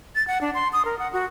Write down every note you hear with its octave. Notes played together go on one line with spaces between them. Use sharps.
A6
F#5
D4
C6
D#6
A#4
F#5
F#4